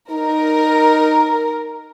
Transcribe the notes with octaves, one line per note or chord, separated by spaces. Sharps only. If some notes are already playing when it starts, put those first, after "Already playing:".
D#4 A#4